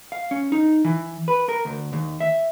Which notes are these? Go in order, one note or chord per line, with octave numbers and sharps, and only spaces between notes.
F5
C#4
D#4
E3
B4
A#4
D2
D#2
E5